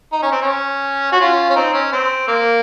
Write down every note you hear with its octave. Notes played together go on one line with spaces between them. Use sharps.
D#4
C#4
C4
C#4
F#4
C#4 F4
C#4
C4 D#4
C#4
C4
A#3